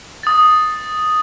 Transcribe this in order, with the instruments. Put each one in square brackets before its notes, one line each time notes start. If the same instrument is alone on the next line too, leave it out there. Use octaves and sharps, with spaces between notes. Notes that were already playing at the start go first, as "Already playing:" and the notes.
[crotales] D#6 A6